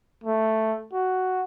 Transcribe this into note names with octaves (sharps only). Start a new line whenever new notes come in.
A3
F#4